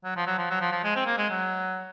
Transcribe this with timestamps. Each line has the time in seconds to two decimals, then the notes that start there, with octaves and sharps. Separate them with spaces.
0.04 F#3
0.16 F3
0.27 F#3
0.38 F3
0.51 F#3
0.61 F3
0.72 F3
0.84 G#3
0.96 C4
1.06 A#3
1.18 G#3
1.30 F#3